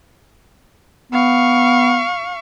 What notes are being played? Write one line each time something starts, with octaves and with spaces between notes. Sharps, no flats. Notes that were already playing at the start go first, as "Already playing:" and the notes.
B3 F5 C#6